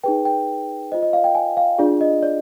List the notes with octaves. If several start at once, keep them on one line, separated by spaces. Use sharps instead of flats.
D#4 G#4 B4 G5
G5
F4 C5 D#5
D#5
F5
G5
G#5
F5
D4 F4 G#4 D5
D#5
D5